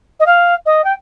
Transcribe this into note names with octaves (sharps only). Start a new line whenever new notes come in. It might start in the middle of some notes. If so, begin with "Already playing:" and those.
D#5
F5
D#5
G5